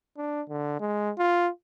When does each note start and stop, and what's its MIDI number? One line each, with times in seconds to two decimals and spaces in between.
0.18 0.42 62
0.49 0.78 50
0.80 1.11 56
1.18 1.49 65